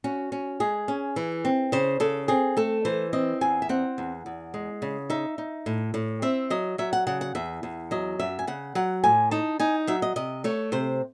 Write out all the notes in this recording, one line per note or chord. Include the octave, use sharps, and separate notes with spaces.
C#4 F#4
C#4
G#3 G#4
C#4
E3
C4
C#3 C5
C#3 A4
C4 G#4
A3 A4
E3 C5
C4 D#5
E2 G#5
E5
C4 F#5
E2
E2
G#3
C#3
D#4 E5
D#4
A2
A2
C4 E5
F#3 D#5
F#3 E5
F#5
C#3 F#5
F#5
E2 E5
E2
F#3 D#5
F#2 E5
G#5
C#3 F#5
F#3 F#5
A2 G#5
D#4 A5
D#4 G#5
F#3 E5
D#5
C3 D#5
A3 C#5
C3 C5